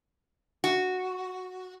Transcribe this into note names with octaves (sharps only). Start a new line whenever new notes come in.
F#4